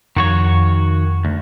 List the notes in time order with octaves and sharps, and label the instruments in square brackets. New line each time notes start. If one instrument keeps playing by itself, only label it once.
[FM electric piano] F2 [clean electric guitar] D#3 F#4 C#5
[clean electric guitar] D2